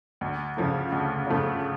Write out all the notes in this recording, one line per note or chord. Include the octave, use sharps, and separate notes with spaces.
D2
C#3 F3 A3
D2
C#3 F3 A3